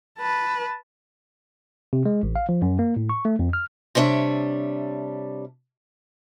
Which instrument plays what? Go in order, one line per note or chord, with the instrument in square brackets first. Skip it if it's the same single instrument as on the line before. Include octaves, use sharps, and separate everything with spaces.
[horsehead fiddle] B4 A5
[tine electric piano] C3
G#3
A1
F5
F3
F#2
A#3
A2
C#6
A3
F2
F6
[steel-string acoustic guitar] C3 G3 D4 C#5 E5